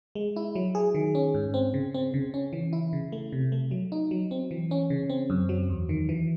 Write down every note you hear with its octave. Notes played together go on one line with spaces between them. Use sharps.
G#3
E4
F#3
G#4
D#3
C#4
G#2
C4
C#3
C4
C#3
C#4
E3
E4
C#3
A3
C3
A3
F#3
D#4
F#3
C4
E3
C#4
C#3
C4
F#2
F#3
E2
D#3
E3